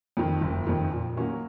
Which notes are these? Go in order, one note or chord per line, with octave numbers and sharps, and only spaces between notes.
F2 D#3
F#1
F2 D#3
A#2
F#3 A#3 C#4 F4